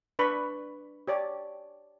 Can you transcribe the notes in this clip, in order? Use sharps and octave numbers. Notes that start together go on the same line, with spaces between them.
D4 B4 B5 C#6
G4 C#5 D5